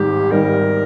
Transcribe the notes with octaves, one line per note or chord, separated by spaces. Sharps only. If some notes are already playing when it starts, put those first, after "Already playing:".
Already playing: G#1 G#2 G3 G4
G#1 G#2 G3 A#4